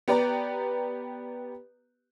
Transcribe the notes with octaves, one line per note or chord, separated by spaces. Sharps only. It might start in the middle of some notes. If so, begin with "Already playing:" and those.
B3 G4 B4 D5 A#5